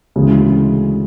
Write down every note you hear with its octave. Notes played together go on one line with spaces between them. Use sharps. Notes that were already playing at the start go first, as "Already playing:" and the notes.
D2 C#3 E3 G#3